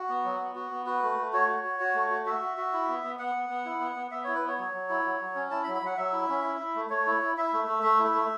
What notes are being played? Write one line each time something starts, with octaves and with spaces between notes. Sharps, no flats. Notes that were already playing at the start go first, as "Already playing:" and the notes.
Already playing: F#4
B3
F#3
B3
F#4
B3
F#4 B4
A3
A3
F#4 C#5
F#4
F#4
F#4
A3
F#4
F#4 E5
F#4
F#4
E4
B3
B3
B3 F#5
B3
B3
E4
B3
B3
B3 E5
E4 C#5
B4
B3 C#5
F#3 C#5
F#3
E4
F#3
F#3
C#4
E4 A5
B5
F#3
B5
F#3 F#5
F#3 E5
E4
C#4
E4
E4
A3
A3 C#5
E4
E4
E4 E5
A3
A3
A3
E4
A3